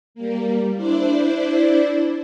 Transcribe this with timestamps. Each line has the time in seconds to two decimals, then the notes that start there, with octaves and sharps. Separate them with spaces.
0.15 G3 A#3
0.75 D4 E4 C5 D5